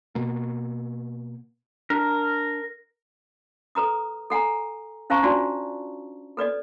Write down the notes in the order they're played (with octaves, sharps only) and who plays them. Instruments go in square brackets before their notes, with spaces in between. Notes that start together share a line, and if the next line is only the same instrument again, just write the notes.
[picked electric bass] B2 A#3
[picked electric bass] D4 [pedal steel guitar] A#4
[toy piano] A4 B4 A#5 D#6
A4 F#5 G#5 A#5
C#4 C5 F5 A5 A#5 C#6
D4 F4 F#4 D5 A5
A4 B4 D5 D#5